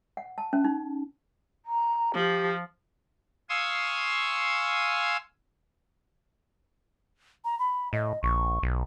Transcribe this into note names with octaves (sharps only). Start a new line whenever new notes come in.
F#5
A5
C#4
D#4
A#5
F3 G4
F5 G#5 C6 C#6 D#6 E6
A#5
B5
A2 D#5
A#1 C#6
B1